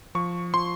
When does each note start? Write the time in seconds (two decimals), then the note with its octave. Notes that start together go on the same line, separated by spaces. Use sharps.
0.15 F3 C#6
0.54 F3 C6